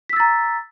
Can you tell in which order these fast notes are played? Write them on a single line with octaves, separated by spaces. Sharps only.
B6 E6 A6 A#5